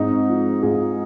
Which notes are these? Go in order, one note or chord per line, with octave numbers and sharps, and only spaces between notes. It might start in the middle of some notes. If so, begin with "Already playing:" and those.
Already playing: G#2 C4 D#4
F3
G#2 F4 G#4